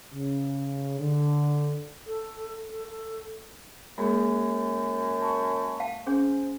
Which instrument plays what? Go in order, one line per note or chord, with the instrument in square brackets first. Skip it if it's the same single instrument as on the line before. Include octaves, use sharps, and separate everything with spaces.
[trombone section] C#3
D3
[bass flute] A4
A4
A4
[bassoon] F#2 [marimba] G#3 A#3 G#4 [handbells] B5
[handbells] A5 C#6
[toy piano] F5 G5 A5
[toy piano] C#4 G#4 C6 [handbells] C5 G#5